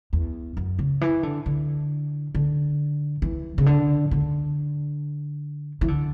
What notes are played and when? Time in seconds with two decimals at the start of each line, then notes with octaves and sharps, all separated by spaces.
0.13 E2
0.57 F#2
0.79 C#3
1.01 E3
1.23 D3
1.46 D3
2.35 D3
3.22 E3
3.58 C#3
3.66 D3
4.11 D3
5.81 E3
5.88 D3